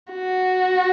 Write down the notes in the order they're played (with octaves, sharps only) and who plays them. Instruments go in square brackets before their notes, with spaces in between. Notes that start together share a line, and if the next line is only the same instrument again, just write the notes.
[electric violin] F#4